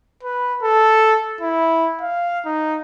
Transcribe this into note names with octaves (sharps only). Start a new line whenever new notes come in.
B4
A4
E4
F5
D#4